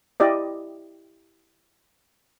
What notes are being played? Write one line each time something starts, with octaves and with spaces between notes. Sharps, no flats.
E4 G4 D5 D#5